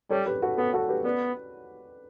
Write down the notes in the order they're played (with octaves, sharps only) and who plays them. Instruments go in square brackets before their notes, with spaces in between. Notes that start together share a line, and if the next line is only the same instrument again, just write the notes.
[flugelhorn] G3 [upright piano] A4 C#5
[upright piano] G4 B4
F#4 A4
[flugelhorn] B3 [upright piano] F#4 A4
[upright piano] F#4 A4
G4 B4
[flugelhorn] B3 [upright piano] B4 D5